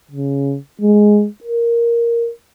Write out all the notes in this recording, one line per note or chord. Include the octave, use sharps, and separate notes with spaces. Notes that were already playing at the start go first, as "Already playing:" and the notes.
C#3
G#3
A#4